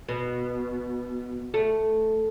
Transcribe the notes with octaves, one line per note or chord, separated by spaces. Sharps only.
B2
A3